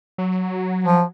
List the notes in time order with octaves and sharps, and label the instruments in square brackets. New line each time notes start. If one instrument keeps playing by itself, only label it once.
[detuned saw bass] F#3
[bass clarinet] F3